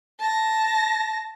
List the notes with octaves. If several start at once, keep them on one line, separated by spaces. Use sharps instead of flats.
A5 A#6